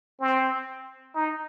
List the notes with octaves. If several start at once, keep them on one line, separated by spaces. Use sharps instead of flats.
C4
D#4